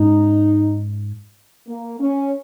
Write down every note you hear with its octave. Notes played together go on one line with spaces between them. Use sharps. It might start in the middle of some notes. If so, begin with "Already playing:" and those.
Already playing: G#2 G#3 C#4 D#4
A#3
C#4